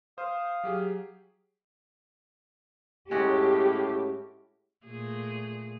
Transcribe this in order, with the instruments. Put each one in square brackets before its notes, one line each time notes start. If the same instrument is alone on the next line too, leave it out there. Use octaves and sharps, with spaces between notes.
[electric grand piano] C5 [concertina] F5 D#6
[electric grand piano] F#3 G4 G#4
[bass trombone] A2 [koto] G#3 C#4 F#4 [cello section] G4
[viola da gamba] A#2 A3 G#4